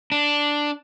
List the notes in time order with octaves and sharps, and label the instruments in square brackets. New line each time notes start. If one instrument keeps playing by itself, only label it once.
[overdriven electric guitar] D4